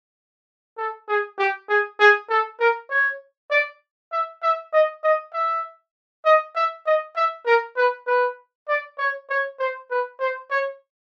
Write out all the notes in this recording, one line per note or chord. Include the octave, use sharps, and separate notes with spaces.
A4
G#4
G4
G#4
G#4
A4
A#4
C#5
D5
E5
E5
D#5
D#5
E5
D#5
E5
D#5
E5
A#4
B4
B4
D5
C#5
C#5
C5
B4
C5
C#5